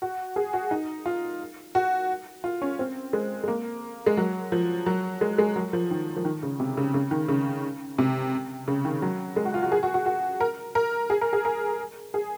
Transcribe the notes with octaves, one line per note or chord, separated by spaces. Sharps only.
F#4
G#4
F#4
D#4
F4
F#4
F4
C#4
C4
G#3
G#3
A#3
G#3
F#3
F3
F#3
G#3
G#3
F#3
F3
D#3
F3
D#3
C#3
C3
C#3
C#3
D#3
C#3
C3
C#3
D#3
F#3
G#3
F#4
F4
F#4
G#4
F#4
F#4
F#4
A#4
A#4
G#4
A#4
G#4
A#4
G#4